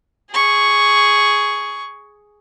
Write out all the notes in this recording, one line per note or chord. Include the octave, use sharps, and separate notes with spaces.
G#4 C#6